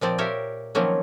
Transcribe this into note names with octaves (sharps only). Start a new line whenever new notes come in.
A#2 F3 C4 D5
G4 A#4 C#5 E5 F5
D#3 F3 F#3 A#3 C4 C#4